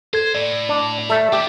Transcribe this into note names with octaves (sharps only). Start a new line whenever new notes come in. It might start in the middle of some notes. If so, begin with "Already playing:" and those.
A4 C5 G#6
A2 D5
D4
A3 A4 E5
E2 D4 G4